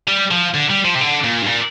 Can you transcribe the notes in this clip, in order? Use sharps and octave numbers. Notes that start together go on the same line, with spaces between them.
G3
F3
D3
G3
F3
C3
D3
A#2
G2
A#2